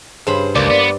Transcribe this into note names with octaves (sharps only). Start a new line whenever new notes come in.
G2 C#3 C5 B5
C#2 A#3 D5
B3